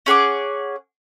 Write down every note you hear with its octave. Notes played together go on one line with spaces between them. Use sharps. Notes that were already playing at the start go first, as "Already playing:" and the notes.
C#4 G#4 F#5 D6